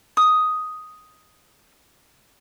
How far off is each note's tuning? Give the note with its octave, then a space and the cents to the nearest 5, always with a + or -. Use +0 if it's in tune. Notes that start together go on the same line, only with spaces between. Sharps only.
D#6 +5